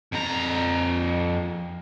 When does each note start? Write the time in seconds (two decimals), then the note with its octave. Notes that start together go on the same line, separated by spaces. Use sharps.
0.13 F2 A#5